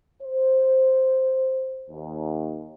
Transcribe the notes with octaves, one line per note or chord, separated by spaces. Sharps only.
C5
D#2